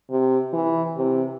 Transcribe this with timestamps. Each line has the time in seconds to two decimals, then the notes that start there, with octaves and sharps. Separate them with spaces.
0.10 C3
0.53 E3
0.97 C3